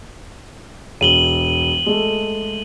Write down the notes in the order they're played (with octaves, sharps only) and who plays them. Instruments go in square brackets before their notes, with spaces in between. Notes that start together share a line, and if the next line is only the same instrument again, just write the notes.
[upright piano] E1 [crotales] D#7 F#7 G7
[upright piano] G#3 A3